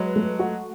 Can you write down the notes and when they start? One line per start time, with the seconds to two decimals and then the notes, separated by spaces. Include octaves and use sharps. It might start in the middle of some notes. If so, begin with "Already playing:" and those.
Already playing: F#3 G#3 B4
0.16 A3
0.39 F#4